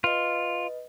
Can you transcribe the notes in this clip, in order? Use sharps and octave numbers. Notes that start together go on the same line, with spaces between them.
F4 B4 D#5